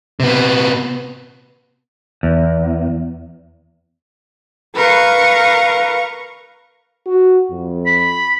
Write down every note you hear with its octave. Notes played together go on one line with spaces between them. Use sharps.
C3 B3
E2
A#4 B4 F5 C#6
F#4
F2
B5